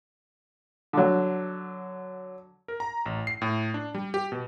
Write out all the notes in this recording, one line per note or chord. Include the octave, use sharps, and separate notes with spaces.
D3 F#3
A#4
A#5
A1
C7
A2
D4
G3
G4
B2